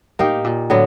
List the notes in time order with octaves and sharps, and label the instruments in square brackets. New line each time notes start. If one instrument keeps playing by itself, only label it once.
[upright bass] A2 [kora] A#3 D#4 G4
[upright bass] A#2
[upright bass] A2 [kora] D3 F#3 B3